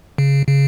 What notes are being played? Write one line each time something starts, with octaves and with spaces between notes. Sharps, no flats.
C#3
C#3